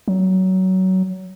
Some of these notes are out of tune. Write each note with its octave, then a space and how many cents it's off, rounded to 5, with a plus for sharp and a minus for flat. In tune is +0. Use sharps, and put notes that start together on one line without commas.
F#3 +20